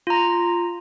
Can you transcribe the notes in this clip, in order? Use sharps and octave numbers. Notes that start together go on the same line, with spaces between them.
F4 A#5